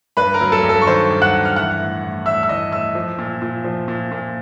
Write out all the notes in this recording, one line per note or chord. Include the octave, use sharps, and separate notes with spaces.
G2 B4 B5
A#4 A#5
F#3
A4 A5
G2
A4 A5
C#6
D#3 C5 C6
G2
F#5 F#6
G2
F6
E3 F#5 F#6
A2
A2
A2 E5 E6
E6
E3 D#5 D#6
A2 E5 E6
F3
A#2
A#2
F3
A#2
A#2